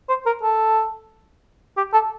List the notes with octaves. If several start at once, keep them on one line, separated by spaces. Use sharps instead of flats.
C5
A#4
A4
G4
A4